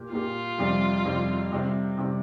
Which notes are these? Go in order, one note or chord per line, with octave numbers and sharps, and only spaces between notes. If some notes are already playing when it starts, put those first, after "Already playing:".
Already playing: A#2 A#3 G4
A#2 A#3 F4 G4
F2 C3 G3 C4
F2 C3 G3 C4
C3 G3 C4
C3 G3 C4